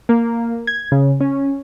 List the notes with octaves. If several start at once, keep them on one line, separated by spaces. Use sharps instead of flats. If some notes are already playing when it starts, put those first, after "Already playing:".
A#3
G#6
C#3
C#4